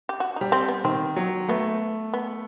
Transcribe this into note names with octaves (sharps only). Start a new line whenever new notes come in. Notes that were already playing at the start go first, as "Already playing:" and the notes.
G4
F#4
G3 D#4
C4
B3
D#3 C4
F#3
A3 B3
B3